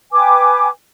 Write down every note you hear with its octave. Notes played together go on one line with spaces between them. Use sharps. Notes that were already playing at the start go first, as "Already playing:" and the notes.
B4 G5 G#5 D6